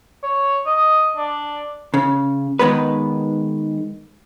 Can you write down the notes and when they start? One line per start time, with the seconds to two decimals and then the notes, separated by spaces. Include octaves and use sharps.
0.23 C#5
0.66 D#5
1.17 D4
1.94 C#3
2.59 D#3 G#3 B3 B4